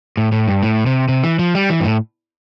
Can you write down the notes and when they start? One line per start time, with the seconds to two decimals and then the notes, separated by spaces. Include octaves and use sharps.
0.17 A2
0.32 A2
0.48 G2
0.63 A2
0.86 C3
1.08 C3
1.24 E3
1.39 F3
1.55 G3
1.70 E3
1.80 G2
1.85 A2